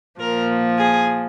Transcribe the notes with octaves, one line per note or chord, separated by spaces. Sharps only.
A#2 F3 A#4
G#4